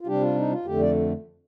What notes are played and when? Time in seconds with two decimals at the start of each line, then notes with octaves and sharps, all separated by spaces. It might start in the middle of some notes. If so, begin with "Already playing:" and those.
0.01 F4
0.07 C3 G3 D4 G4
0.21 F4
0.36 D#4
0.51 F4
0.65 F2 D3 A3 G4
0.81 D5